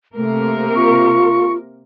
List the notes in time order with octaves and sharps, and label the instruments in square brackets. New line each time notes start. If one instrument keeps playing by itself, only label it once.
[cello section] C3 A#3 A#4 [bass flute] A3
[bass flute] F4 [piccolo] C#6